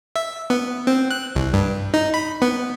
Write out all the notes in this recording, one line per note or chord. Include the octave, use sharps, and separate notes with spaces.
E5
B3
C4
F#6
C2
G2
D#4
B5
B3